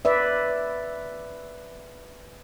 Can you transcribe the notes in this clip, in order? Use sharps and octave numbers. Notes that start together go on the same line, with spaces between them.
B4 D5 E5